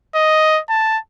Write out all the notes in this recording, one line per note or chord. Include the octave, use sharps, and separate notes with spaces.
D#5
A5